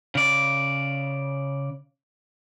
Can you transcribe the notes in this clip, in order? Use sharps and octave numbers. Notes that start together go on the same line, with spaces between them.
C#3 D5